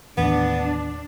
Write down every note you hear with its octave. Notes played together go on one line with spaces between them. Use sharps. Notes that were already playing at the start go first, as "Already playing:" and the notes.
D#2 A2 E3 B3 D4